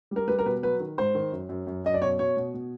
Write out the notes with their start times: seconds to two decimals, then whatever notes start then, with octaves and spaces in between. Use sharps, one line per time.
0.11 G3 A#4
0.28 G3 B4
0.39 A#4
0.45 B2 B4
0.63 F#3 B4
0.80 D#3
0.98 G#2 C5
1.15 D#3
1.32 F#2
1.49 F#2
1.67 F#2
1.84 F#2 D#5
1.94 D5
2.02 B2 C#5
2.19 B2 C#5
2.37 B2
2.54 B2